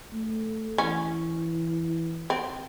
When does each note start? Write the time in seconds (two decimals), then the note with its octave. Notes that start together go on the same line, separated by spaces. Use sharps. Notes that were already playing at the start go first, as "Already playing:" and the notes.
0.12 A3
0.78 E3 C#4
2.30 C4